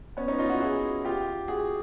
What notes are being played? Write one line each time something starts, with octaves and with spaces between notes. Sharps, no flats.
B3 C#4
C#4 D#4
D#4 F4
E4 F#4
F#4 G#4
F4 G4
F#4 G#4